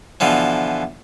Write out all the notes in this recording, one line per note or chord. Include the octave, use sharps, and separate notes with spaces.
B2 D3 E3 F3